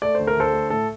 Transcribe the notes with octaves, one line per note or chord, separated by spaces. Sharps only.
A3 D5
D2 C5
A#4
D3 A4 C5
A3
A2 A4